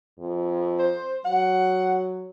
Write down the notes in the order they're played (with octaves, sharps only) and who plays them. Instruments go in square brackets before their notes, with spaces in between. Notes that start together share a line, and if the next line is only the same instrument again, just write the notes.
[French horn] F2
[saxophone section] C5
[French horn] F#3 [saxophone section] F#5